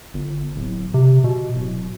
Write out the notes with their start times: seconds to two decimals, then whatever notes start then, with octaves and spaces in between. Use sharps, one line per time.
0.14 G1
0.56 D1
0.94 C3
1.24 B2
1.55 D1